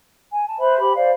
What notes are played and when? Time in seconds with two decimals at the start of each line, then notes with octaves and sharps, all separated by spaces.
0.31 G#5
0.46 A5
0.58 B4 C5 E5 B5
0.77 G4 B5
0.94 C5 D5 F5